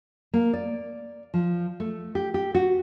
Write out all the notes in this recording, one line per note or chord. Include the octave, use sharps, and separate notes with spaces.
A#3
D5
F3
A3
G4
G4
F#4